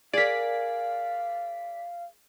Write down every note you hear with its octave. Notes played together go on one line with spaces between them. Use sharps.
G#4 A#4 D5 F5 B6